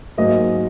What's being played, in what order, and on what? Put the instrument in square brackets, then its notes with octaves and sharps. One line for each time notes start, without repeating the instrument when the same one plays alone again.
[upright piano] G#2 F#3 A#3 D#5